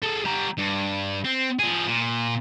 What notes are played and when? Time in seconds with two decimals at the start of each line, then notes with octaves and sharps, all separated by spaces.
0.03 G#4 A4
0.25 G3 A#5
0.58 G2
1.25 C4
1.59 F3 G#4
1.87 A#2